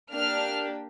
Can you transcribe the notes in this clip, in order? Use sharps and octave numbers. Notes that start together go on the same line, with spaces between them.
A#3 D4 G4 F6